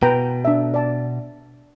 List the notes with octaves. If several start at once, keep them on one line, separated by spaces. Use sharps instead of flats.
B2 B4 G5 A#5
D4 E5
D5 A5